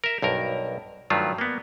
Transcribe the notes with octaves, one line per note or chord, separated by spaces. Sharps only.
A#4 E5
B1 G2 A#4
G2 D#3 F#3 A3 F4
A#3 B3